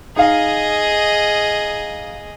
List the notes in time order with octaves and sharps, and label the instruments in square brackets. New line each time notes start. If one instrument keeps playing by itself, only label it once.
[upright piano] D#4 F5 [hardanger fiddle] G#4 D#5